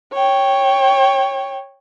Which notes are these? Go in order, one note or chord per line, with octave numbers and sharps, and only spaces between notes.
C#5 G5